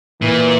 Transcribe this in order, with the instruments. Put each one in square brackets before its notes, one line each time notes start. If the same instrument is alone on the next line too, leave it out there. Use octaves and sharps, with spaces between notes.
[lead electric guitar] A#2 [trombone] E3